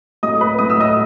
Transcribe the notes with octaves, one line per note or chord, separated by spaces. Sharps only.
A2 F#3 A3 D#5 D#6
B4 B5
A2 F#3 A3 D#6
E6
D#5 D#6